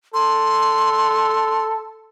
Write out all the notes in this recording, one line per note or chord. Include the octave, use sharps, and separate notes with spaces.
A4 C6